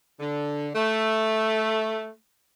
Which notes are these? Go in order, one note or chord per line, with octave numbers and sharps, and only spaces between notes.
D3
A3